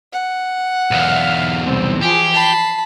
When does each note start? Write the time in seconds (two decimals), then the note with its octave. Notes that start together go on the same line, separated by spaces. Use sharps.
0.13 F#5
0.91 B1 E2 E5 F5 F6
1.63 C2 C4
2.01 E3 F3 G4 G#4
2.33 A5 B5 C7